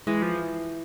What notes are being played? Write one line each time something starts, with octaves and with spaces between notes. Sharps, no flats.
E3 G#3
F3